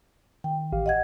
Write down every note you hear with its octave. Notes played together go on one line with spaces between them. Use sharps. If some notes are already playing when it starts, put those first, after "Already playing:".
D#3 G5
A1 G4 F5
D#5 F#5 G#6